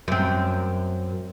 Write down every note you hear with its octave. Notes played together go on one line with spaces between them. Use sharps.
F#2 C4